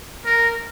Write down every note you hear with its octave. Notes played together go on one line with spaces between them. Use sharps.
A#4